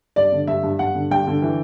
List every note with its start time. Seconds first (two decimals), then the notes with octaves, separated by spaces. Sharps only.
0.16 G2 D5
0.32 D3
0.47 G2 E5
0.63 G2
0.79 G2 F#5
0.95 D3
1.11 G2 G5
1.27 D3
1.42 E3